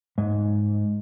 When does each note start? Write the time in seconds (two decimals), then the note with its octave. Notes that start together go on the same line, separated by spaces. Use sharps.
0.18 G#2